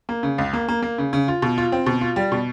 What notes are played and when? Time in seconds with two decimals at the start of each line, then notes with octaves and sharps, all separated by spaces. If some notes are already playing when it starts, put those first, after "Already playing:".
0.09 A#3
0.23 C#3
0.38 C#2
0.53 A#3
0.68 A#3
0.82 A#3
0.98 C#3
1.13 C#3
1.28 F4
1.42 B2
1.58 F4
1.72 C4
1.86 B2
2.01 F4
2.16 G3
2.32 B2